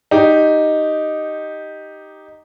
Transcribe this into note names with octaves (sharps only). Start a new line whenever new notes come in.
D#4 G4